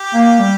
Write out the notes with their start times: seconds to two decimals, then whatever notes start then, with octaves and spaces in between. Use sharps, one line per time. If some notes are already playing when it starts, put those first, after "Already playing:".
Already playing: G4
0.14 A#3
0.39 G3